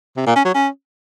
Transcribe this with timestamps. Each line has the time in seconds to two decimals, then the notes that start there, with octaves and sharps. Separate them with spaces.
0.17 C3
0.26 A#2
0.36 C#4
0.45 F#3
0.54 C#4